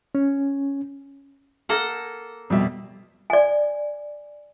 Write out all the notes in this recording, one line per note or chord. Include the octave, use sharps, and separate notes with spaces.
C#4
A#3 A4 F#5
F2 B2 G3 E5
D5 G#5